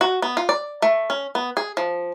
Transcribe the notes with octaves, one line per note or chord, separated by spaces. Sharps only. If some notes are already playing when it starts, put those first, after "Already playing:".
F#4
B3
F4
D5
A3
C#4
B3
G#4
F3